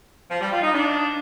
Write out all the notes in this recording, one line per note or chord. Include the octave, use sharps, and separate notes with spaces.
F3
G3
F4
D#4
D4